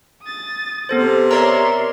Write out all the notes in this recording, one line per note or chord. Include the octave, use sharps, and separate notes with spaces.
D#6 A6
C3 B3 A4 C5
A#4 C#5 D5 E5 A#5 C6